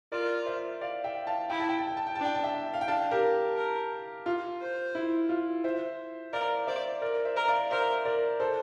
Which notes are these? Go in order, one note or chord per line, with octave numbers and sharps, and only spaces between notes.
F4 A#4 D5
C5 E5
D5 F5
E5 G5
F5 A5
E4 G5
A5
G5
A5
G5
A5
G5
D4 A5
G5
A5
E5 G5
F5
G5
D4 F5 A5
G4 A#4
A#4
F4
C5
E4
F4
C5 E5
A#4 D5 F5
C5 D5 E5
A#4 D5
C5 E5
A#4
D5 F5
A#4 C5 E5
A#4 D5
A4 C5